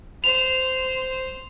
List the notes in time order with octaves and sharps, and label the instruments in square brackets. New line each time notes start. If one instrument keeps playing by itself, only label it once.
[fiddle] C5 [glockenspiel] F7